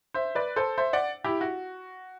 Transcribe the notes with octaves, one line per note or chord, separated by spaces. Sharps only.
C5 E5
B4 D5
A4 C5
C5 E5
D5 F#5
E4 G4
F#4